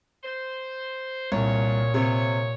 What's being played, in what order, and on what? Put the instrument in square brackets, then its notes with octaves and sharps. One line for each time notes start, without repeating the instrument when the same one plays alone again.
[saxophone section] C5
[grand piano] C2 [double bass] A#2 [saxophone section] C#5
[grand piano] C3 [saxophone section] C#5